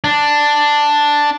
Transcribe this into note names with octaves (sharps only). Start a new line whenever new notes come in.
D4